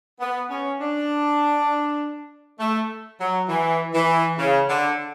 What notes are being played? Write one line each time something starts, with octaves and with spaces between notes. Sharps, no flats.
B3
C#4
D4
A3
F#3
E3
E3
C#3
D3